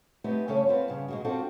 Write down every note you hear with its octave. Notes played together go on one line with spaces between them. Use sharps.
A3 B3 C4 D#4 G4
G2 C#3 A3 C#4 A4 C#5
B3 C4 F4
G2 C#3
B2 G#3 F#4
C4 D4 F4 F#4 A4 G5